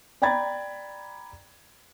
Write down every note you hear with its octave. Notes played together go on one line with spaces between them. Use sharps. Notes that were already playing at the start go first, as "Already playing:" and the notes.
D5 G5 A#5 B5 G#6 A6